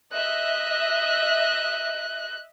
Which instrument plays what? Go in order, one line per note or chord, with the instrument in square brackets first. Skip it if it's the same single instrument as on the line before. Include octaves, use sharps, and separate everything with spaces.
[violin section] D#5 E5 [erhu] F#6